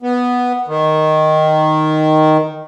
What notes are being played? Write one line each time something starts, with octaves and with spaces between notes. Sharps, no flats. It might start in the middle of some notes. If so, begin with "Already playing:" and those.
B3
D#3